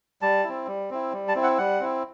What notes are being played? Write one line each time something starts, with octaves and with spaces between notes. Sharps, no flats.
G3 A5
C4 E4
G3
C4 E4
G3
A5
C4 E4
F#5
G3 F#5
C4 E4